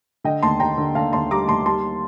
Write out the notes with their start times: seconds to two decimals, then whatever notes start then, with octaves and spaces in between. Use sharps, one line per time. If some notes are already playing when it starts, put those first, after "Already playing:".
0.24 D3 D#5 G5
0.43 D#2 A5 C6
0.60 D#2 G5 A#5
0.78 D3
0.95 D3 F5 A5
1.13 D#2 A5 C6
1.31 G3 A#5 D6
1.48 D#2 A5 C6
1.66 G3 A5 C6